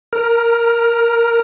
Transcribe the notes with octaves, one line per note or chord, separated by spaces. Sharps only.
A#4